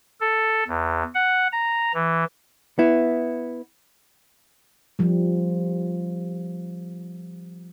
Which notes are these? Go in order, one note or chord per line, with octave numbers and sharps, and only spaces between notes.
A4
E2
F#5
A#5
E3
B3 E4
F3 G3